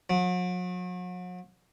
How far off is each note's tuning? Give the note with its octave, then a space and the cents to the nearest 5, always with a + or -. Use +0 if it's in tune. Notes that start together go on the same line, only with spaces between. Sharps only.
F#3 -40